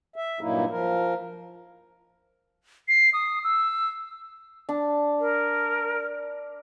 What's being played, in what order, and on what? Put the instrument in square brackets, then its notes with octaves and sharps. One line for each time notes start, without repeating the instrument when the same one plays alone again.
[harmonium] E5
G2 A#2 F#3 A#3 D#4 E4
F3 A#4
[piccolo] C7
D#6
E6
[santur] D4
[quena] A#4